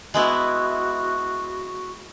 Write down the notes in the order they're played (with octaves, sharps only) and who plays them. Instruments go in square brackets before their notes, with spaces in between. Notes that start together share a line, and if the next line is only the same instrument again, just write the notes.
[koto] G#3 B3 E4 [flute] F#4